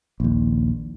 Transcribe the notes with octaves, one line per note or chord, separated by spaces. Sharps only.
A#1 D#2